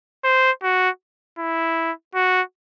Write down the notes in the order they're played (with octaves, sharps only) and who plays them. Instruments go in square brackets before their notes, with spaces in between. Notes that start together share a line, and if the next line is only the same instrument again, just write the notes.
[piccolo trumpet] C5
F#4
E4
F#4